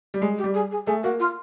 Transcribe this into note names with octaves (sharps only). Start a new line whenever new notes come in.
G3 G4
G#3 G#4
G4
G3
G#4
G#4
A3 G#4
A#3 F#4
F4